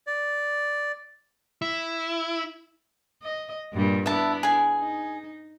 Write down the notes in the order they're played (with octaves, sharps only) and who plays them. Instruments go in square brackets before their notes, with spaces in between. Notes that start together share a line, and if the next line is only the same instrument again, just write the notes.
[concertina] D5
[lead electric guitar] E4
[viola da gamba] D#5
G2 A#2 G3
[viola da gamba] B3 D4 E4 [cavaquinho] E5 A5
[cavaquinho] G#4 G#5
[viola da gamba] D#4